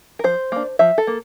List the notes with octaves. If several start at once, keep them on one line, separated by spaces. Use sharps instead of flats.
A#4
F3 C5
A#3 D4
F3 E5
A4
A#3